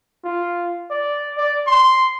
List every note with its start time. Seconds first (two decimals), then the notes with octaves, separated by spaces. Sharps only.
0.25 F4
0.91 D5
1.37 D5
1.67 C6